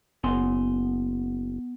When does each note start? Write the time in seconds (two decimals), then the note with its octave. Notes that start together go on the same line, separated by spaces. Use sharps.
0.24 F#1 B3 G#5 C6